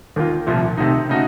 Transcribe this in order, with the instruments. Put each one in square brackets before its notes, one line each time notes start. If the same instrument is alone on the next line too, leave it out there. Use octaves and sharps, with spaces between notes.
[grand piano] D#2 D#3 A#3 F4
C2 A#2 F3 A3
C3 D#3 A3 D#4
C#3 A3 D#4 F#4